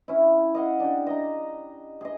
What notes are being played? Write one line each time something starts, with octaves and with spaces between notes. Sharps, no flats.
C#4 E4
D#5 F5 F#5
D4 G4
D#5 A#5
G#4 D#5